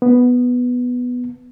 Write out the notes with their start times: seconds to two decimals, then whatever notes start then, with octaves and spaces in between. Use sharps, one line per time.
0.02 B3